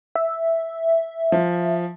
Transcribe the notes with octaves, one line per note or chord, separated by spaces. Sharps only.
E5
F3